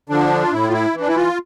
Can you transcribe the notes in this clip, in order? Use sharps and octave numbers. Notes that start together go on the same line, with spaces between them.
D3 F3 D4
F4
A2 E4
F4
E4
E3
D4
E4
F4